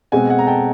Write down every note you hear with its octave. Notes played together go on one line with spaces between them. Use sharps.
B2 G#3 C4 F#5 G#5
F#5 G#5
A#5
G5 A5